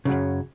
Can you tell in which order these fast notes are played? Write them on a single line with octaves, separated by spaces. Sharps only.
C#3 F#3 F#2